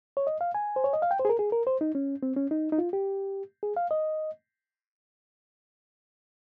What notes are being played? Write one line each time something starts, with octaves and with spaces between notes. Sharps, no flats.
C#5
D#5
F5
G#5
C5
C#5
D#5
F5
G5
C5
G#4
A#4
G#4
A#4
C5
D#4
C#4
C4
C#4
D#4
D#4
F4
G4
G#4
F5
D#5